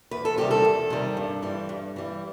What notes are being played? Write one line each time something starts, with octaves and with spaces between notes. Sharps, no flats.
E2 B4
A4
C3 D#3 G3 G4
A4
E2
C3 D#3 G3
G2
E3 G3
G2
E3 G3